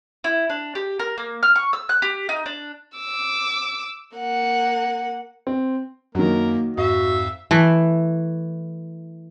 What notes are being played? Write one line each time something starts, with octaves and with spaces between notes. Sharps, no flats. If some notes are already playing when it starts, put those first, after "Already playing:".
E4
D4
G4
A#4
A#3
F6
C#6
E6
F#6
G4
D#4
D4
D6 E6
A#3 F#5
C4
F#2 D#3 F#3 A#3 A#4
F2 G#2 F#4 E5 F5
E3 A3